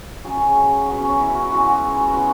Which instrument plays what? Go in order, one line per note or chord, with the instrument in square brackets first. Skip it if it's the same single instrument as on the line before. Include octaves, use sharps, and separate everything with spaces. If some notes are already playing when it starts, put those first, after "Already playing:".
[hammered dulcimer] C#3 F#3 G#4
B2 F#3 F#4
C#4
C#4
E4
F#4
C#3 E3 G#3 F#4
F#4
F#4
B2 G#3 F#4